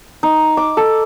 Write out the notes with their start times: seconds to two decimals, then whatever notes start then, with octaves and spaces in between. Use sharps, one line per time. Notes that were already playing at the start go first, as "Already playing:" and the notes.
0.23 D#4
0.57 D6
0.77 A4